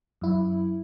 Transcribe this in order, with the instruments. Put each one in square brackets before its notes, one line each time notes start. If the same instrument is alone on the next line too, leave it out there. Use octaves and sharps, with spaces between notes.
[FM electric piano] F#2 E4